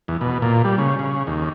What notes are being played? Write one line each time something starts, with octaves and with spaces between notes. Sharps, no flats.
E2
B2
A#2
G3
C#3
C#3
D#2